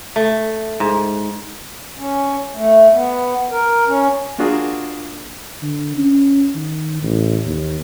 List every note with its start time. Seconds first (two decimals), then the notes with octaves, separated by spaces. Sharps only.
0.16 A3
0.80 G#2
1.98 C#4
2.55 A3
2.93 B3
3.51 A#4
3.87 C#4
4.38 A#3 D4 F4 F#4 G#4
5.62 D3
5.97 C#4
6.55 D#3
7.02 A1
7.46 D#2